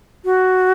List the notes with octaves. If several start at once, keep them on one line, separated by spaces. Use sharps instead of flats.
F#4